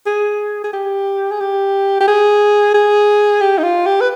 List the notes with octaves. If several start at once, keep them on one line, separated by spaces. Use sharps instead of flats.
G#4
G#4
G4
G#4
G4
G4
G#4
G#4
G4
D#4
F4
G4
B4